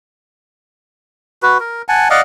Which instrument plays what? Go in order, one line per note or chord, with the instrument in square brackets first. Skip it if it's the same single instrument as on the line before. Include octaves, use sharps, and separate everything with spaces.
[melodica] F#4 B4
A#4
F#5 G#5 A5
D5 D#5 F5 F#5